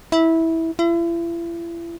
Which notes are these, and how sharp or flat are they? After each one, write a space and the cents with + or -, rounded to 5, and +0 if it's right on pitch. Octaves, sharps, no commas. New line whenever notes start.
E4 -15
E4 +40